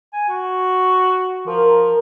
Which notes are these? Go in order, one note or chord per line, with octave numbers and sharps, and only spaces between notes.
G#5
F#4
F3 A#4